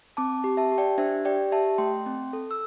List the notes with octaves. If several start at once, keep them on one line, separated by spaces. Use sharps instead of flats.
C4 A5 D6
G4
E5 A5
G4
D5 G5
D4 C5 E5
G4 D5 G5
G4 E5 A5
A3 G5 C6
C4
A4
E6